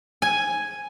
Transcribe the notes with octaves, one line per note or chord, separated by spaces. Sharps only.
G#5